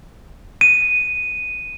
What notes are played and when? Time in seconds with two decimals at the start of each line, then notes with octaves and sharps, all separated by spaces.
0.61 D#7